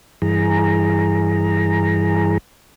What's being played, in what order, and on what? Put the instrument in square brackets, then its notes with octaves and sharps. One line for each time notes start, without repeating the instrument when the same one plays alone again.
[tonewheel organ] G2 E3 G#4 A#5